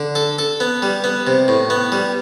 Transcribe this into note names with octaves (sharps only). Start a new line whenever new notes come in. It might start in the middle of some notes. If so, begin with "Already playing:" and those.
Already playing: D3
A4
A4
B3
G3
B3
C3
A2
B3
G3